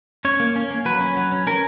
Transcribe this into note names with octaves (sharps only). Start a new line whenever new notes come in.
C#4 C#5
A#3
C#4
A#3
F#3 B4
C#4
F#3
C#4
C#4 A#4